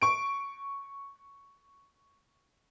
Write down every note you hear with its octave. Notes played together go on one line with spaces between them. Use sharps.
C#6 D7